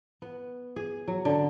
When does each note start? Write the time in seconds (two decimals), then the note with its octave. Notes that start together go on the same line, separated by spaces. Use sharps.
0.22 B3
0.76 G#4
1.08 F#3
1.25 D3